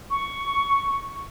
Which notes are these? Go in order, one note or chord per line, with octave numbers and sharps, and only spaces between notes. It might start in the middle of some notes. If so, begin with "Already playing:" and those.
C#6